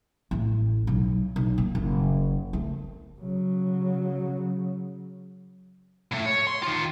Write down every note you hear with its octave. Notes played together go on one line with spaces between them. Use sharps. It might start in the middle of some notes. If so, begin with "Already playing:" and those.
A1
B1
B1
A#2
F#1
A3
C#3 F#3
A2 A3
C#5
C6
D#3 F4